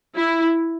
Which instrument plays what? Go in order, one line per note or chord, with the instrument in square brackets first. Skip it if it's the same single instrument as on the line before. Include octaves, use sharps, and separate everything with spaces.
[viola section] E4